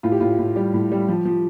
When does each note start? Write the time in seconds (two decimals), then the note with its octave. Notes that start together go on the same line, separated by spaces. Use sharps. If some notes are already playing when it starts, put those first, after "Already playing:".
0.03 A2 F4
0.12 G4
0.21 A2 F4
0.39 A2
0.56 G3 G4
0.74 A2
0.92 G3
1.08 F3
1.25 F3